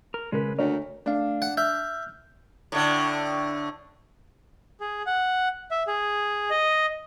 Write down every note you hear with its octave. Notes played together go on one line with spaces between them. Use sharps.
A#4
C#3 G#3 C#4 A#4 B4
D2 A3 A#4 C#5
A3 D4 F5
F#5
E5 F6 G6
A2 D3
G#4
F#5
E5
G#4
D#5